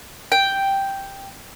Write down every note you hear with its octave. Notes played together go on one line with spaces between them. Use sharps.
G5